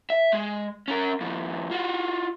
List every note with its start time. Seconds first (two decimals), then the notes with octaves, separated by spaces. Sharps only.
0.10 E5
0.32 G#3
0.88 C#4 A#4
1.21 D#2 F3
1.71 F4 F#4